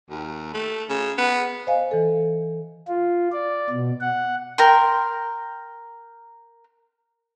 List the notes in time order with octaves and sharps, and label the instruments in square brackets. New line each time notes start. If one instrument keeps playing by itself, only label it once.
[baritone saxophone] D#2
A3
C#3
B3
[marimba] C5 D#5 F5 G#5
E3 A4
[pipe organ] F4
D5
B2
F#5
[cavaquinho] A#4 G5 C6